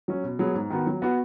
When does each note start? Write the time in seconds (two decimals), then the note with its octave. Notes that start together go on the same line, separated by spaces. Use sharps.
0.08 F#3 C#4
0.24 B2
0.39 F#3 B3 G#4
0.54 G#2
0.70 D#3 B3 F#4
0.87 F#3
1.02 B3 F#4